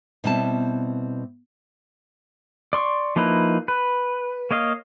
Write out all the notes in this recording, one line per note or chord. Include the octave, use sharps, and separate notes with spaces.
B2 G3 B3 C4 E4 A5
D5 C6 C#6
F3 A#3 D#4 E4 B4
B4
A#3 C#5 D#5 F5